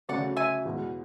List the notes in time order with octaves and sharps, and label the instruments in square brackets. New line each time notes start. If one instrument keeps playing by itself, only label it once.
[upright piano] D2 C#3 F#3 A3 [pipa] D5 F#5
[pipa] E5 G#5
[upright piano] E2 B2 G#3